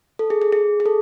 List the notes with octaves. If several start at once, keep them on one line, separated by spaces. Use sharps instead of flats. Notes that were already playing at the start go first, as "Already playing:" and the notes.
A4
G#4
G#4
G#4
G#4
A4